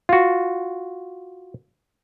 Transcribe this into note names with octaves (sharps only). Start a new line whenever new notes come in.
F4 F#4